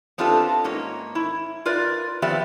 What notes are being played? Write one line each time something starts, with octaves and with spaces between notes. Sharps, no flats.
B3 C4 D4 F4 G4 A4
G#2 A#3 C#4 C#5
E4
F4 A#4 B4 D5
F3 B3 C4 G4 D5 E5